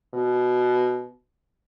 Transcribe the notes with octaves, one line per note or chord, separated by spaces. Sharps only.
B2